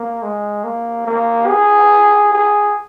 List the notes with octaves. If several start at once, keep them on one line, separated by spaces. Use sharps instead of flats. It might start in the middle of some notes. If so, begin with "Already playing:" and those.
Already playing: A#3
G#3
A#3
A#3
G#4
G#4